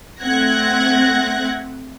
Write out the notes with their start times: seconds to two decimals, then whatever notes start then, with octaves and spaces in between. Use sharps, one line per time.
0.21 A3 C4 F#5 F#6 G#6 A#6